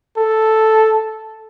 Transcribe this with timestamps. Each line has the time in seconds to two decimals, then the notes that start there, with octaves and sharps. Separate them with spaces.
0.17 A4